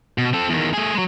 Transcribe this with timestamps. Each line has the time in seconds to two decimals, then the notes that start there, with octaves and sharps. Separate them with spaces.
0.18 B2
0.33 C4 A4
0.50 E2 D#3
0.74 A3 G#4
0.95 F#3 G#3